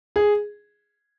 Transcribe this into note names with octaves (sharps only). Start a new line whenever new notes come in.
G#4